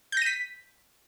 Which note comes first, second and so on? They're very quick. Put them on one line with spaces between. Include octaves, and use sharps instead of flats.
G6 A#6 D#7 B6